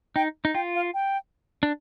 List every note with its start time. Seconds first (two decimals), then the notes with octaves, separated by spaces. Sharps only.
0.16 D#4 G5
0.45 D#4
0.54 F4 G5
0.75 F5
0.94 G5
1.63 D4